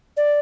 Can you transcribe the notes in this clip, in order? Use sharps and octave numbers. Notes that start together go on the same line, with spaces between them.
D5